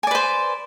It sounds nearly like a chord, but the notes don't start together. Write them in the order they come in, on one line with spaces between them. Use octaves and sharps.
G#5 D5 B4 C5